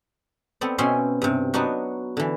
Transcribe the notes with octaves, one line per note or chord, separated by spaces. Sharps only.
B3 C4 A4 D5
B2 C4 C#4 E5 G#5 C6
G2 C3
F#3 B3 D4 D#4 F#4
D3 E3